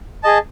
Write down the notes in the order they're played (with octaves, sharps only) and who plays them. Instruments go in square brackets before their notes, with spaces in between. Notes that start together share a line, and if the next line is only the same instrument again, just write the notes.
[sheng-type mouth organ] G#4 D#5 A5